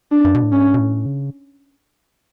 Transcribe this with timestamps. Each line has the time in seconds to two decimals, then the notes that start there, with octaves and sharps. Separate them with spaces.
0.12 D4
0.25 F#2
0.35 B2
0.43 A2
0.52 G#2 C#4
0.74 B2
0.79 A2
1.06 C#3